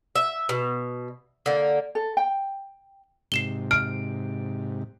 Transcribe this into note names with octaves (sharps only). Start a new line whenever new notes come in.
E5
B2
D3 A#3
A4
G5
G#2 C3 C7 E7 G7
F6 D7